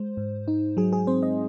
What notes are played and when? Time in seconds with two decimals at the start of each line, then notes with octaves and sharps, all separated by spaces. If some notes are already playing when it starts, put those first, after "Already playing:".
Already playing: G#3 C5
0.17 G#2
0.48 D#4
0.77 F#3 G#4
0.93 G#4
1.07 C4 C5
1.23 D#5